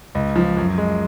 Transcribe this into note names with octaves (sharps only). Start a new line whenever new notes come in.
C#2
F3
F#2
G#3